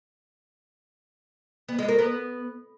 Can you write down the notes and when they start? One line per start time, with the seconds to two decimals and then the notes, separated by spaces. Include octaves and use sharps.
1.68 B3
1.78 G#3
1.89 A#4
1.99 B3